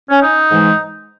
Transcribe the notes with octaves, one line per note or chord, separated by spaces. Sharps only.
C#4
D#4
G#2 E3 G#3